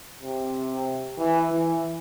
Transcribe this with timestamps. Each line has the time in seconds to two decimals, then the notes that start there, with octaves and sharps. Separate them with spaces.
0.21 C3
1.18 E3
1.51 E3